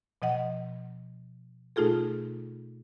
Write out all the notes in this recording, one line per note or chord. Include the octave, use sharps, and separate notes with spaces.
B2 F3 D#5 F#5
B2 A3 D#4 F4 G#4 A4